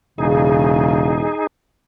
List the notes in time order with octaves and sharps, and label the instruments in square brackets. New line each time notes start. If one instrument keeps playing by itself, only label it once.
[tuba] E1 [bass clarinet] C#3 [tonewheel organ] D#4 G#4